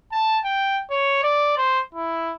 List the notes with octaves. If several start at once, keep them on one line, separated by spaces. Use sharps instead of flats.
A5
G5
C#5
D5
C5
E4